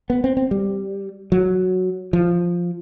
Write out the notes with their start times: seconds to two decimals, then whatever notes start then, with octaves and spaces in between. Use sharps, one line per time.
0.10 B3
0.24 C4
0.37 C4
0.51 G3
1.32 F#3
2.13 F3